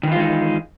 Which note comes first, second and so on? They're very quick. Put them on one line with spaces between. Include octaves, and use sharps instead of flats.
D#3 E3 F4 G#3 D#4